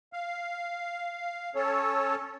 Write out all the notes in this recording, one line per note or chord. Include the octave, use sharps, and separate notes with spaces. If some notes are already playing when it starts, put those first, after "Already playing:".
F5
C#4 A4 C#5